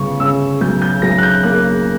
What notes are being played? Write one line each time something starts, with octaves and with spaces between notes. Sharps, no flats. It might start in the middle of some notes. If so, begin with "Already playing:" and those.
Already playing: G1 C#3 C#6
C#3 E6
B1 G6
G6
B1 A#6
F#6
G6
A#3 F#6